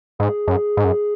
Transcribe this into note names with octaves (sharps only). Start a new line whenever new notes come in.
G#2 G#4
F#2
G#2
F#2